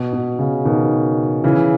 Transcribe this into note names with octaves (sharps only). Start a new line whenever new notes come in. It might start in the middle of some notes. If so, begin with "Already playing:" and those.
Already playing: B2
B2
C#3
B2 D#3
C#3 E3